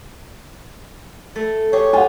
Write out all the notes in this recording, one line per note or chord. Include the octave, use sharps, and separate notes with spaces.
A3 E5
G4 G#4 C#5
F4 G4 F#5 G#5